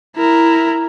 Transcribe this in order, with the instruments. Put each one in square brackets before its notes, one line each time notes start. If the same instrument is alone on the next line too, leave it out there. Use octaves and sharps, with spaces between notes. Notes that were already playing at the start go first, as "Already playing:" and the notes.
[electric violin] E4 A#4